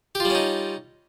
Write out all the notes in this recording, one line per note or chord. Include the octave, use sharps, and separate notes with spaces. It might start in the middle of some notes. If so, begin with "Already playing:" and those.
G3 C#4 D#4 F4 G4